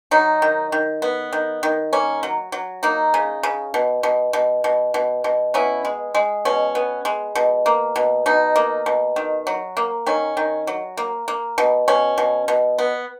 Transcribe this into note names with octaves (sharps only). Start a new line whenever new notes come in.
F#3 D#4
D#3
D#3
B3
D#3
D#3
A#3 C#4
F#3
F#3
A#3 D#4
C#3
C#3
B2
B2
B2
B2
B2
B2
B3 C#4 E4
G#3
G#3
B2 C#4
B3
G#3
B2
A#3
B2
B2 D#4
A#3
B2
D#3
F#3
A#3
D#3 C#4
D#3
F#3
A#3
A#3
B2
B2 C#4
B2
B2
B3